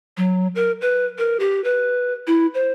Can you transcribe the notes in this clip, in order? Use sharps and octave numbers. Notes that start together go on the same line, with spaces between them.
F#3
A#4
B4
A#4
G4
B4
E4
C5